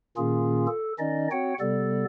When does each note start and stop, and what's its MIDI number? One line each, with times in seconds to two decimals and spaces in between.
0.17 0.67 46
0.17 0.67 51
0.17 0.67 58
0.17 0.67 61
0.17 0.67 65
0.17 0.67 68
0.67 0.93 69
0.99 1.28 51
0.99 1.28 61
0.99 1.28 63
0.99 1.28 74
0.99 1.28 75
1.31 1.54 60
1.31 1.54 66
1.31 1.54 73
1.31 1.54 78
1.31 1.54 79
1.60 2.05 48
1.60 2.05 55
1.60 2.05 59
1.60 2.05 69
1.60 2.05 74